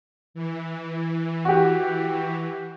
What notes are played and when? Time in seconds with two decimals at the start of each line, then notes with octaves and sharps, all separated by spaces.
0.34 E3
1.45 F#4 G4